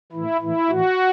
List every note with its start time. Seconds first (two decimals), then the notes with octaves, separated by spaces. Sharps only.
0.12 A2 E3 E4
0.41 A2 E3 E4
0.69 A2 E3 F#4